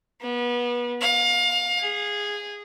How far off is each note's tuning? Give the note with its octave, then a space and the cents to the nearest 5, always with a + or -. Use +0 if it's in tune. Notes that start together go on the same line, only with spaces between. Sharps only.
B3 -30
F5 +30
G#4 -15